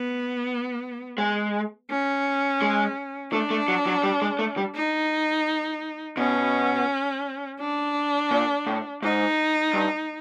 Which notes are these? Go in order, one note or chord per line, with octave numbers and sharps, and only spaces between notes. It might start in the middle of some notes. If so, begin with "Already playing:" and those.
Already playing: B3
G#3
C#4
G#3
A3 D4
A3
F#3
F#3
G3
G#3
A3
G3
D#4
B2 C#4
D4
A#2
A2
G#2 D#4
G2